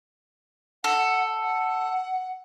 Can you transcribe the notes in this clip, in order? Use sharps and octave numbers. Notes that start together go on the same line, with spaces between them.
A4 F#5
F#5